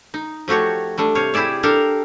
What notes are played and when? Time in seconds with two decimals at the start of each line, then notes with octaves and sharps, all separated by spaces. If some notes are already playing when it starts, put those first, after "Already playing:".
0.14 D#4
0.48 F3 A3 F#4 G4 C#5
0.98 G3 A3 D4
1.15 C3 C#5 F5
1.34 E4 G4 G#4 D5 E5
1.63 D4 G4 A4 A#4 F5